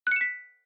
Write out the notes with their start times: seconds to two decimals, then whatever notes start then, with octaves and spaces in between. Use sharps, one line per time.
0.07 F#6
0.11 C#7
0.16 E7
0.21 B6